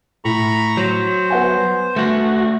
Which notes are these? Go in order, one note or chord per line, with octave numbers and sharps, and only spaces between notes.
A2 A#5 B5 C#6
F#3 C5
B3 F#5 G#5
A3 F#4